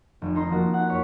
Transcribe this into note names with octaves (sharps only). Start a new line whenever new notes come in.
F1
C4 D#4 A#5 C6
F3 A#3 F#4
G#4 F#5
F2 C#5 B6